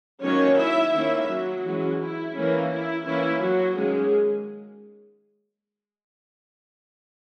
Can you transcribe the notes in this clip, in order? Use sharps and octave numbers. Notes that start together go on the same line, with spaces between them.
D#3 F#3 A#3 C#4 C#5
E4 E5
D#3 A#3 C#4 E4 E5
F#3 F#4
E3 G#3 C#4
E4
E3 A#3 C#4
E4
E3 A#3 C#4 E4
F#3 F#4
D#3 F#3 G#3 A#3 C#4 G#4